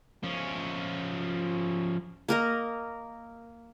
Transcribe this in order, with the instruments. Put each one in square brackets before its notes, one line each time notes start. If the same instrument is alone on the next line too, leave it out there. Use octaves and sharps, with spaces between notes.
[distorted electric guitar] F3 C#4
[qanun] A#3 A#4 D#5